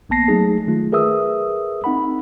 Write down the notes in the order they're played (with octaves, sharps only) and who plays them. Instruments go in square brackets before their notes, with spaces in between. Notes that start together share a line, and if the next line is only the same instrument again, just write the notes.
[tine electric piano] A#1 A#3 B3 A5 A#6 C7
F#3 A3 D#4 G#4
D#3 A3 F4
G#4 A#4 B4 E5 D#6 E6
C4 D#4 F#5 B5